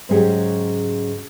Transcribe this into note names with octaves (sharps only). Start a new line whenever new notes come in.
G#2 C#3 F#3 C#4 G4 G#4